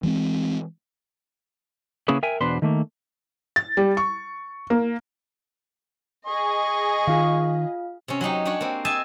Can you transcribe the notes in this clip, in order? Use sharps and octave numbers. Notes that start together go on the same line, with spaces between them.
E3 G#3 B3 C4
C#3 A#3 C#4 E4 G#4 B4
A#4 E5 G5 G#5
E2 B2 D4 B4 C5 C6
D#3 A3 A#3
A6
G3
C#6
A#3
G#4 D#5 C#6
D#3 F4 F5
C3 C#4
F#3 C#4 D#4 G4
D4 F#4 G4 C#5
A#3 C4
G4 D#5 E5 G#5 A5